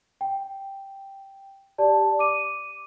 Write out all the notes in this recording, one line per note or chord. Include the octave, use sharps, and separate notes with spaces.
G5
G4 D5 A5
D6 D#7